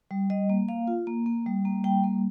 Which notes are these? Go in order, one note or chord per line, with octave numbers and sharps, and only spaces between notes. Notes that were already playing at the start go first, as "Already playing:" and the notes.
G3
G3 D#5
A#3
A#3 F5
F4
A#3
A#3
G3
A#3
G3 G5
A#3